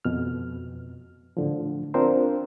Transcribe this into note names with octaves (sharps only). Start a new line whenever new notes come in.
F2 B2 F6
A2 D3 F3
C4 D4 F4 A#4 C5